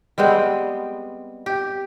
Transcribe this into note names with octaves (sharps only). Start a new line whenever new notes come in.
G3 G#3 B3 C4
G4